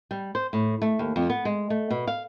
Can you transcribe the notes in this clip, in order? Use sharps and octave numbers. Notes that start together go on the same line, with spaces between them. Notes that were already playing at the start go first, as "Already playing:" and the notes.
G3
C5
A2
A3
D#2
F2
B3
G#3
A3
B2
F5